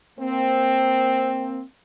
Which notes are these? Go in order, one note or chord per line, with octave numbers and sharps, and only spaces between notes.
A#3 C4